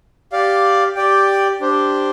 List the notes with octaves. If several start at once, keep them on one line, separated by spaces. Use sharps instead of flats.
G4 D5 F5
G4 D5 G5
D4 G4 C5